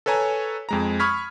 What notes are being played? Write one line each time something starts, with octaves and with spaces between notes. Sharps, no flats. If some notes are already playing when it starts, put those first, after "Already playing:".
A4 B4 C#5 G#5 A#5
F2 G#3 A#5
B5 C#6 D#6 F6 G#6 B6